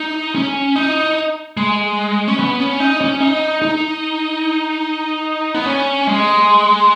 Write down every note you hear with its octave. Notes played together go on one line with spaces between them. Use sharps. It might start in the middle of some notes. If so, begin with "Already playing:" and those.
Already playing: D#4
C#4
D#4
G#3
C#4
B3
C#4
D#4
C#4
D#4
D#4
B3
C#4
G#3